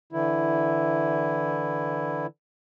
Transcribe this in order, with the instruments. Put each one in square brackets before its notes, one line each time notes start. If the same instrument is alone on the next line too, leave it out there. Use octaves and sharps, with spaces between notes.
[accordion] D3 E3 E4